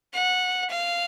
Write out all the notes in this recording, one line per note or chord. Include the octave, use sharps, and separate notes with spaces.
F#5
F5